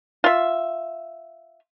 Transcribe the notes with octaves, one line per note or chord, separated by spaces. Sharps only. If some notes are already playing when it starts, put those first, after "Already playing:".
F4 E5